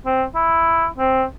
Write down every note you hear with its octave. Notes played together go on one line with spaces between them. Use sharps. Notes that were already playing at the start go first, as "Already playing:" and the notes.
C4
E4
C4